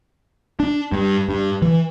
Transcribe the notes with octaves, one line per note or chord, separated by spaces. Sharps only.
D4
G2
G2
E3